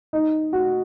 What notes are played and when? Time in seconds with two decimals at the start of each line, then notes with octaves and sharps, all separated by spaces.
0.13 D#4
0.53 F#4